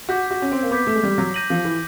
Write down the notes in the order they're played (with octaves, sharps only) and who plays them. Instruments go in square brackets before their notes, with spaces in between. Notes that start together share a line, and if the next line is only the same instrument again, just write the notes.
[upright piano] F#4 [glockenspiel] D6 G6 B6
[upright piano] F#4
C#4
C4
A#3
[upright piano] B3 [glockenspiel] D6 G6 B6
[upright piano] A3
G#3
G3
F#3
[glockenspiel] G6 A#6 D#7 F#7
[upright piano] F3
E3